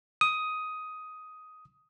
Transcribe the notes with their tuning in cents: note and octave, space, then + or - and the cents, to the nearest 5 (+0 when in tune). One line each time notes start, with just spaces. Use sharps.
D#6 +10